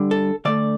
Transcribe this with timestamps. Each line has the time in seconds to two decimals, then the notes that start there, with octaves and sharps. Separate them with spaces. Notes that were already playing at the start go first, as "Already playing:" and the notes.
Already playing: D3 G3
0.11 A4
0.45 D3 A3 D5